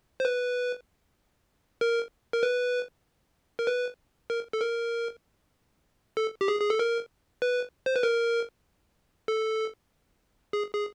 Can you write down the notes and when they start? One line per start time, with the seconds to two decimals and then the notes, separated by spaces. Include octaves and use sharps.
0.20 C5
0.25 B4
1.81 A#4
2.33 A#4
2.43 B4
3.59 A#4
3.67 B4
4.30 A#4
4.53 A4
4.61 A#4
6.17 A4
6.41 G4
6.48 G#4
6.61 G#4
6.70 A4
6.79 A#4
7.42 B4
7.86 C5
7.96 B4
8.03 A#4
9.28 A4
10.53 G#4
10.74 G#4